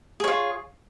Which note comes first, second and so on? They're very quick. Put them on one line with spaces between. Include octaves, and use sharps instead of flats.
G#4 C#5 F4